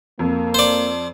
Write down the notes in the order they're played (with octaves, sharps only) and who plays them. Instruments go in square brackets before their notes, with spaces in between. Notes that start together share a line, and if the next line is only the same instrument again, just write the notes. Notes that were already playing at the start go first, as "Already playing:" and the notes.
[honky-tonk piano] F2 [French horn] A#3
[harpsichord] C5 D5